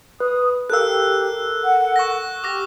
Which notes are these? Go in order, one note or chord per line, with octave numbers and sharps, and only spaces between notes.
B4 D#6
G4 A4 A#4 F5 E6 F#6
F#5
C#6 F#6 A#6
G4 D6 F6 A#6